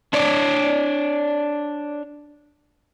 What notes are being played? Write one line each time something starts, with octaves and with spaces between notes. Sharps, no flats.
D4 C#5 D5